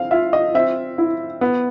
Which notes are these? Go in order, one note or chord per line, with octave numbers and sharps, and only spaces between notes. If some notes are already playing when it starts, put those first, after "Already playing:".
Already playing: C4 F5
F4 E5
D#5
C4 E5
E4
B3